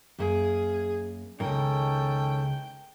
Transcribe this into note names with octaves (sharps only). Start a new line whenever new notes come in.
F#2 A#3 G#4
C#2 F#2 D#3 C#4 A4 A#4 G5